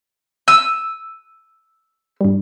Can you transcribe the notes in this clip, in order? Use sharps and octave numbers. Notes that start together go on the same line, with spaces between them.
E6 D#7
G2 G3